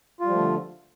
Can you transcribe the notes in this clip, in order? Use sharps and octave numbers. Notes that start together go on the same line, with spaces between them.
D3 F3 G3 A3 F4